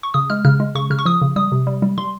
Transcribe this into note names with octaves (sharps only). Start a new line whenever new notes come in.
C#6
C#3 D#6
G#3 F6
C#3 F6
G#3
C#3 C#6
C#3 F6
C#6
F3 D#6
C#3
G3 D#6
C3
G3
G3
G3 C6